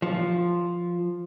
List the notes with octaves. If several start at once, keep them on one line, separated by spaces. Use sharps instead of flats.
F3